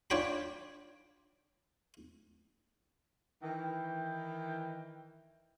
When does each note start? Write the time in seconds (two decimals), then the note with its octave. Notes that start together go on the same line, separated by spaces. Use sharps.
0.10 D4 F4 C#5 G5 B5
3.42 D#3 E3 G5